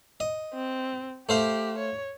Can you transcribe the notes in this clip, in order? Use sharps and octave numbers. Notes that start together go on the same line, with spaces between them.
D#5
C4
A3 G4 C5 F5
C#5